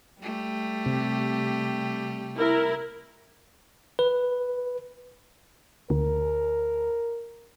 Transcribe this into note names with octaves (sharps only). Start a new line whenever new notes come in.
G3 A3 G4
C3
E4 A#4
B4
D2 A#4